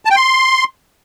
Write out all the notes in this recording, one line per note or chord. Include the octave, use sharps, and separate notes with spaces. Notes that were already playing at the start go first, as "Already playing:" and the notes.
A5
G5
C6